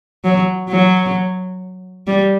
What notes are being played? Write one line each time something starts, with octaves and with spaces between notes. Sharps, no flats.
F#3
F#3
G3